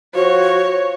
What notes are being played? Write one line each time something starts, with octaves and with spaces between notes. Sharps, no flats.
F3 F#4 C#5